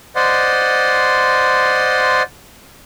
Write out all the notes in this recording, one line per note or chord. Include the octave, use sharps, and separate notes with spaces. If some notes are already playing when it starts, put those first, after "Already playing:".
C5 D5 D#5 F#5 C6